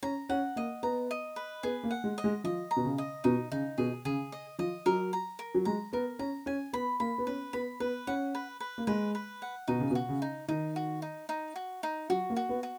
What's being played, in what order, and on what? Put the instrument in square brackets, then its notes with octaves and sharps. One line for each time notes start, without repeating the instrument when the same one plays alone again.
[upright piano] C#4 [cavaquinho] A#5
[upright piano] C#4 [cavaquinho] F#5
[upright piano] A#3 [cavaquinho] D#5
[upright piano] B3 [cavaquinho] A#5
[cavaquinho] D#5
B4
[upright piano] B3 [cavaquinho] G#4
[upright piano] A#3
[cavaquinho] F#5
[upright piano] G#3
[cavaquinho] D#5
[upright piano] G#3
[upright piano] F3 [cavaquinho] D#5
[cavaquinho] A#5
[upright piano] B2
C#3
[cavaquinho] D#5
[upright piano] B2 [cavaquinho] D#4
[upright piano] C#3 [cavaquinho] D#4
[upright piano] B2 [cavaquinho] G#4
[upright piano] C#3 [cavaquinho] G#4
[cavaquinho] D#5
[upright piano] F3 [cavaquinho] D#5
[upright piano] F#3 [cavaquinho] A#4
[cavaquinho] A#5
A#4
[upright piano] F#3
[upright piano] G#3 [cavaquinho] A#5
[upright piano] B3 [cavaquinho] A#4
[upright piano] C#4 [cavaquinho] A#5
[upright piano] C#4 [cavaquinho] G#5
[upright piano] B3 [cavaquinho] B5
[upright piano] A#3 [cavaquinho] B5
[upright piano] B3
[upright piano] C#4 [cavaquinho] B4
[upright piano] B3 [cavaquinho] B5
[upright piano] B3 [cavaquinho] B4
[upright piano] C#4 [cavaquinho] F#5
[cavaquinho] B4
B4
[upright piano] A#3
[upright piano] G#3 [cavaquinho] B4
[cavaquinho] B4
F#5
[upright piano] B2 [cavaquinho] D#4
[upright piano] C#3
B2
[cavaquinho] F#4
[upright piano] C#3
[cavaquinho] D#4
[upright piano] D#3 [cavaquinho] D#4
[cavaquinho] F#4
D#4
D#4
F#4
D#4
[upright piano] F#3 [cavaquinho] F#4
[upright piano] A#3
[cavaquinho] F#4
[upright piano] B3
[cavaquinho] F#4